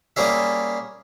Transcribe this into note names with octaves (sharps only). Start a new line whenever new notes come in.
G3 A#3 C#4 G#4 E5